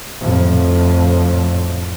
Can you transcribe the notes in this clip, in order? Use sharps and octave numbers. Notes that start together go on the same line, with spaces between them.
F2 A2